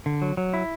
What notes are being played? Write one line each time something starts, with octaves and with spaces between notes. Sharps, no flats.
D3
F#3
F#3
E4